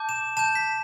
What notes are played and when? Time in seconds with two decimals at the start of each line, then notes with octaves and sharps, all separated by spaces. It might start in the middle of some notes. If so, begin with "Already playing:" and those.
Already playing: A5 D6 G6
0.09 E7
0.37 A5 G6 E7
0.55 B6